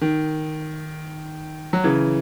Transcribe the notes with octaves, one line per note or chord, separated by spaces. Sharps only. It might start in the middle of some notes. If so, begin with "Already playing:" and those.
D#3
F#3
C#3 E3